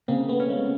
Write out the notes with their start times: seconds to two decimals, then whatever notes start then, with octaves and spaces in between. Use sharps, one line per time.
0.08 C#3 A#3 C4
0.29 A3 B3
0.40 C#4
0.49 G#3 A#3